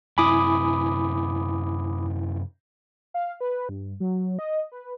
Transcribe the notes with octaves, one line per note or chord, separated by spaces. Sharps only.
F#2 C3 E4 G#5 B5 D6 D#6
F5
B4
G2
F#3
D#5
B4